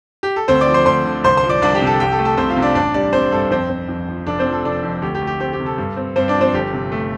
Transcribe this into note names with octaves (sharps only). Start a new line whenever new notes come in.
G4
A4
D2 C4 C5
D5 D6
F3
C5 C6
D2 C5 C6
D3
C2 C5 C6
C5 C6
F3
D5 D6
C2 D4 D5
G4 G5
C3
A4 A5
C2 G4 G5
A4
A3
A4
C2 C4 C5
F4 F5
C3
D4 D5
A1 D4 D5
G3 D4 D5
C4 C5
G2 A4
F2 C4 C5
C4
F2
F3
F1 D4 D5
C4 C5
F3
A4
F1 D4 D5
F2
D2 G4
G4
A3
G4
C4 G4
G4
C3
A4
G2
C4
G2 C4 C5
D4 D5
F3
C4 C5
G1 G4
C3
A3